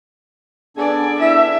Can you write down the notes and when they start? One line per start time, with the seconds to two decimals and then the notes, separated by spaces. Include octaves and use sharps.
0.77 B3 D4 G#4 A4 D5 G#5
1.20 E4 E5